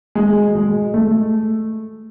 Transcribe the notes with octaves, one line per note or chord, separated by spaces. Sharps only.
G#3
F#3
G#3
A3